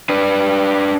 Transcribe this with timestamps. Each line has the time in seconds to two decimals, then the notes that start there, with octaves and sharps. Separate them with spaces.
0.09 D4 B4